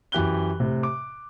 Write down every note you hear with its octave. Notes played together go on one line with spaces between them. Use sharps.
F#2 E3 G4 F#6 G7
A2 C3
D6